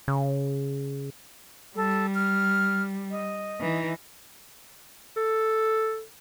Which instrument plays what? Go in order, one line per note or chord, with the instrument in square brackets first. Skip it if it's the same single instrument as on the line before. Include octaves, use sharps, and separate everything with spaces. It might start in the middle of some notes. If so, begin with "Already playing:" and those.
[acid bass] C#3
[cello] G3 [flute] A4
[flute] F6
D#5
[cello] E3 D#4
[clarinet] A4